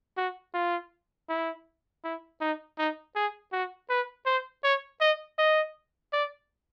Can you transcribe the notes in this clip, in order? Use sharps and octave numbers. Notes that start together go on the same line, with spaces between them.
F#4
F4
E4
E4
D#4
D#4
G#4
F#4
B4
C5
C#5
D#5
D#5
D5